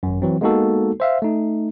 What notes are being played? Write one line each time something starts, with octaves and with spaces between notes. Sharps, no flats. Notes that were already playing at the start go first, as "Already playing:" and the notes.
G#1 F#2
E3 F#3 C4
G#3 A#3 B3 D#4 F#4 A4
C5 E5 F5
A3 D#4